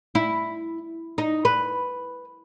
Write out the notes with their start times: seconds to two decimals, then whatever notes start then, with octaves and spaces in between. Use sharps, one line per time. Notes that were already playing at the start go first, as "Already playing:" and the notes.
0.15 E4
1.18 D#4
1.45 B4